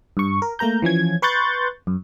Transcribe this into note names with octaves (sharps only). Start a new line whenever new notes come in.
G2 C#6
A#4
A3 A#3 A#4 A#5 G6
E3 F3 C#4 G#6
B4 C6 C#6 F#6 G6 A6
F#2